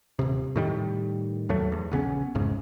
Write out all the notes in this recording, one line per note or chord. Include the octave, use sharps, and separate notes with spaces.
D#1 C3
A2 D#3 G3
D#2 A2 F#3 A3
E2
A#1 C#3 B3 C#4
E1 C2 G#2 C#3